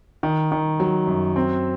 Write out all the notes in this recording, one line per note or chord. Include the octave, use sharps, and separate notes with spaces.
D#3
D#3
F#3
F#2
C4